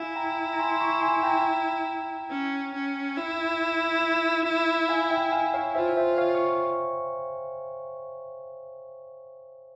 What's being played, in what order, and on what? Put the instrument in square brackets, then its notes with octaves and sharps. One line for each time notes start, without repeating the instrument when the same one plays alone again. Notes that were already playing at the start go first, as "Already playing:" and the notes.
Already playing: [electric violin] E4 [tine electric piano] F5 G#5
[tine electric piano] G5 A#5
A#5
G#5 C6
C6
A#5 C#6
G#5 C6
G5 A#5
[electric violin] C#4
C#4
E4
[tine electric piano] F5 G#5
E5 G5
F5 G#5
C#5 F5
[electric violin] F4 [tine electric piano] C5 E5
[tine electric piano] C5 E5
C#5 F5
C#6